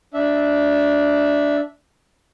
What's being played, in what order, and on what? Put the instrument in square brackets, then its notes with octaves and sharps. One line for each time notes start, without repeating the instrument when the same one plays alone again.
[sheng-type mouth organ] D4 E5